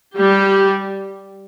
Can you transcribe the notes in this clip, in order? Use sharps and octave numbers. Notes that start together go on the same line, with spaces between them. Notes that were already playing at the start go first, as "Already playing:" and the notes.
G3 G4